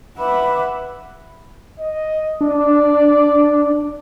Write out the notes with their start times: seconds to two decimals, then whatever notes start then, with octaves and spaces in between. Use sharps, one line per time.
0.18 B4 E5 F#5 B5 D6
1.80 D#5
2.41 D4 D5